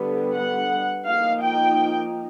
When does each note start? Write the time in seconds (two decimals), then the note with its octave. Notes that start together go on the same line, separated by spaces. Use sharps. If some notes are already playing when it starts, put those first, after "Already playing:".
Already playing: D3 G3 B3
0.35 F#5
1.05 F3 A#3 D#4 F5
1.41 G5